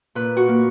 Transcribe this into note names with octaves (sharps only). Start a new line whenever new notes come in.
A#2 B4
F#4
A#3